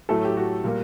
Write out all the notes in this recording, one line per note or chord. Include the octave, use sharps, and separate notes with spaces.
A2 F#3 A3 A4
G4
F#4
A#2 G3 A#3